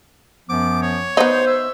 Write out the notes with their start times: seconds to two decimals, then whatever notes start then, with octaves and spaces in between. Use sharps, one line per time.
0.49 F#2 F3 B3 D6
0.82 C#5
1.17 B3 D#4 C5
1.47 E5